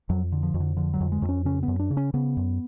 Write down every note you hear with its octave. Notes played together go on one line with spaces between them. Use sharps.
F2 F#3
D3
F3
F2
D3
D3 F3
F#3
F2
G#3
F2
C#4
C#3 C#4
B3
F#2
D4
C#3
C#4
C#3 B3
F#2